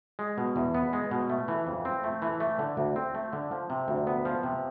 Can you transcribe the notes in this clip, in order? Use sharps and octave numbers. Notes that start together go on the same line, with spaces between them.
G#3
B2
E2
B3
G#3
B2
A3
E3
F2
C4
A3
E3
A3
D3
D2
C4
A3
D3
F3
C3
D2
B3
F3
C3